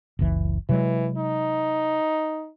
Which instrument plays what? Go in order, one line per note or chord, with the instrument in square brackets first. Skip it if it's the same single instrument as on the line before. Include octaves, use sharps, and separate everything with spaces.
[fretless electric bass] F#1 C#2 E3
[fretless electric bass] C3 F#3 G#3 [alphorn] E3
[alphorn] D#4